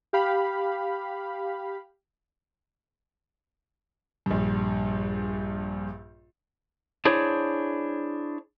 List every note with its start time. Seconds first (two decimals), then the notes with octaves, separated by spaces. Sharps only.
0.13 G4 F5 B5
4.26 A#1 G2
7.05 D4 E4 G#4 C5 C#5